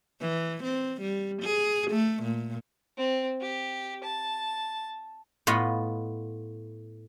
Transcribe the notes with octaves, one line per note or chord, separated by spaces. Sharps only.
E3
C4
G3
G#4
A3
A#2
C4
G4
A5
A2 B3 F4 D#5 B5